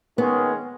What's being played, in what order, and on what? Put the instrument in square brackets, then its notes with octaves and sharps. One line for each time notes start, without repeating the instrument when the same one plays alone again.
[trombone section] D#3 G#3 C#4 G#4 [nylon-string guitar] B3